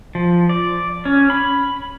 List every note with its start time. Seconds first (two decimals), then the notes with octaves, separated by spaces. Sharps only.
0.15 F3
0.49 D5
1.05 C#4
1.30 B5